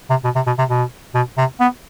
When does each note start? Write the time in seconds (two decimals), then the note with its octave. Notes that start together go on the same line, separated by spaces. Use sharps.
0.10 C3
0.24 B2
0.35 C3
0.47 B2
0.58 C3
0.69 B2
1.15 B2
1.37 C3
1.60 B3